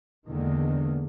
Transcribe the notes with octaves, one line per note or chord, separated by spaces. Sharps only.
E2 D3 D#3 G#3 A#3